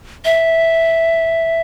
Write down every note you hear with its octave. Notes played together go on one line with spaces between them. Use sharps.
E5